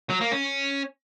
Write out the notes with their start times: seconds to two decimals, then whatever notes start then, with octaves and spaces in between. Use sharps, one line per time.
0.10 F#3
0.21 A#3
0.32 C#4